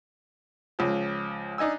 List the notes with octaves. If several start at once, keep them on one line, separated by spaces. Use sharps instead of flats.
C#2 F3
D4 D#4 D#5 G#5 E6